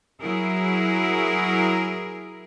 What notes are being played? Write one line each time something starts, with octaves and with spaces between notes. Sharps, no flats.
F#3 E4 G#4 A#4